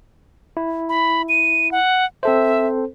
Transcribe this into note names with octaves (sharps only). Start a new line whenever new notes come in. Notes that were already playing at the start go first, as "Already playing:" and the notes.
E4
B5
D#7
F#5
C4 A4 C5 E5